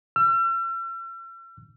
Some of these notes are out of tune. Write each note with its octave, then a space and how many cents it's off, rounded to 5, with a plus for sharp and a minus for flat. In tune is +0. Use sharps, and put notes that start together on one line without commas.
E6 +45